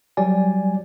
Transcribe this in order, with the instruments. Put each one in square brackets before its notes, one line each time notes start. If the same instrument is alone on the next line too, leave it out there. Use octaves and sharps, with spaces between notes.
[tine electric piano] F#3 G3 D5 G#5